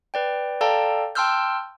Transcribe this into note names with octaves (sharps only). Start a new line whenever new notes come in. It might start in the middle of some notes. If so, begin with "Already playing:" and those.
B4 D5 G5
A4 D5 F5 G5 A5 A#5
G5 A5 C6 E6 F6 G6